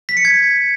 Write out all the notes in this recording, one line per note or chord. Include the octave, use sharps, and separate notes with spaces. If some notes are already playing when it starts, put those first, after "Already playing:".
B6
C#7
G#6